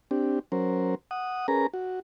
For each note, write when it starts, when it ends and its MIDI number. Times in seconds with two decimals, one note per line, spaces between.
0.11 0.39 60
0.11 0.39 62
0.11 0.39 67
0.52 0.95 54
0.52 0.95 61
0.52 0.95 70
0.52 0.95 72
1.11 1.47 78
1.11 1.47 87
1.48 1.67 61
1.48 1.67 68
1.48 1.67 70
1.48 1.67 71
1.48 1.67 82
1.74 2.00 66